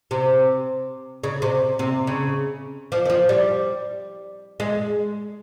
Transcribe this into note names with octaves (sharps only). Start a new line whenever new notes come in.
C3
C#3
C3
C3
C#3
F3
D#3
F3
G3
G#3